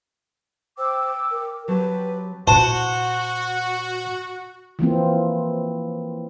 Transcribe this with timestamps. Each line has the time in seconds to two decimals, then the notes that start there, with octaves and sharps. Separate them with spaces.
0.78 C5 G5 D6 E6
1.31 A#4
1.68 F#3 C4 G4 B4 A5
2.47 A#2 E4 F#4 C5 A5
4.79 E3 F3 A#3 C4